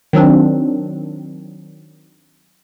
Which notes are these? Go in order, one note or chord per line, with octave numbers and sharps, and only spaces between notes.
D#3 F#3 C4 D4